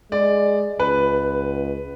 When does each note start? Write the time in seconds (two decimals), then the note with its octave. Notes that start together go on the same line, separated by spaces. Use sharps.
0.12 G#3 D5
0.80 C#2 B4